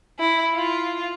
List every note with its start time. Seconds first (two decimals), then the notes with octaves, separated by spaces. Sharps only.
0.19 E4
0.55 F4